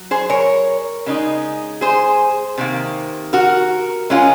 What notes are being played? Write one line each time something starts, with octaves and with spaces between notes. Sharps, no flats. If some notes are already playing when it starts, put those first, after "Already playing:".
Already playing: F#3
G#4 C5
A#4 C#5
C#3 G#3 D#4
G#4 C5
C3 D#3 A#3
F#4 A#4
C#3 G#3 C#4 F4